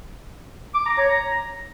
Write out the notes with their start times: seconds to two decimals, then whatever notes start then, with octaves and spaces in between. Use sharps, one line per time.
0.74 D6
0.86 A#5
0.97 C#5
1.09 A#5